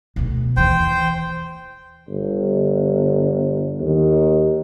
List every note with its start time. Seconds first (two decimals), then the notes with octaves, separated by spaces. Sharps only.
0.16 D2 B2
0.57 D#2 E3 C5 G5
2.08 G1
3.80 D#2